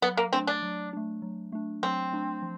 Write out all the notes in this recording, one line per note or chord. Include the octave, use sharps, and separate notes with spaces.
F#3 B3
A#3
A3 C4 D4
D4
F#3
A3 D4
F#3
A3 D4
F#3 C4
A3 D4
F3